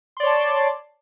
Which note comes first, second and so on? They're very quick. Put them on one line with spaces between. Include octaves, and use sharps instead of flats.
C6 D5 C#5 A5